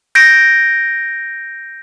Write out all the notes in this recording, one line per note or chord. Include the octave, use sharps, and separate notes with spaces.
G6 A#6 D7